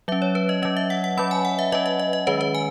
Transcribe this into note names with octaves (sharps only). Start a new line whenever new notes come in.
F#3 C#4 E5
C#5
B4
D#5
F#3 C#4 D#5
E5
F#5
F#5
F#3 C#4 B5
G#5
F#5
E5
F#3 C#4 D#5
D#5
D#5
D#5
D#3 G#3 C#4 B4
B4
G#5